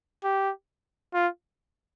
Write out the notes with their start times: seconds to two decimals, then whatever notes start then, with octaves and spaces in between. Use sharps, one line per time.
0.24 G4
1.14 F4